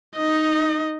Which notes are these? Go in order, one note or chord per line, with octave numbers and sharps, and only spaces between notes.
D#4 D#5